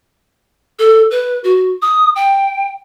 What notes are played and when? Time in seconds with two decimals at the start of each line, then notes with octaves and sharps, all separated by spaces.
0.79 A4
1.11 B4
1.44 F#4
1.82 D#6
2.16 G5